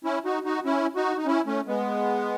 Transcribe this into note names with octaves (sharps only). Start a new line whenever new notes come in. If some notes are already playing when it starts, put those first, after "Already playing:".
C#4 E4
D#4 F#4
D#4 F#4
C#4 E4
D#4 F#4
D#4
C#4 E4
A3 C#4
G#3 B3